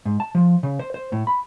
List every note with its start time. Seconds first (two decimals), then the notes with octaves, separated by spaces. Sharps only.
0.05 G#2
0.20 A5
0.35 F3
0.63 C#3
0.79 C5
0.94 C5
1.12 A2
1.27 B5